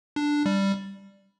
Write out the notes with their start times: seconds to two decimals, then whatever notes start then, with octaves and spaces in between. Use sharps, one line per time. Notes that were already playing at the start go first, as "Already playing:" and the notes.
0.16 D4
0.46 G3